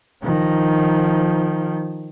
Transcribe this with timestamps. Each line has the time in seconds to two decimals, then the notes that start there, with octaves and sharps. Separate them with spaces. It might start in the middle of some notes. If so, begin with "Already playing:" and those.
0.23 D#3 F3